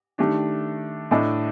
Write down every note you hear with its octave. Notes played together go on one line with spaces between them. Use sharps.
D#3 A3 D4 G4
A2 A3 D4 A4 D#5